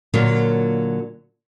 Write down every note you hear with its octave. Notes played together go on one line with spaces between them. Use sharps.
A#2 D3 F#3 A#3 F4 A#4